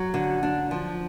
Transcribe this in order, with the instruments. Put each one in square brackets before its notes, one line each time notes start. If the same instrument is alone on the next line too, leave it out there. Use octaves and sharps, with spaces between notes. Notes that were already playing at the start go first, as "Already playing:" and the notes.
Already playing: [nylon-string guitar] F#3
D3
D4
F3